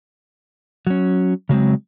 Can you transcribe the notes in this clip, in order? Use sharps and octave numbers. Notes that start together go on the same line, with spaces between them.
F#3 C#4
C#3 F#3 G#3 C4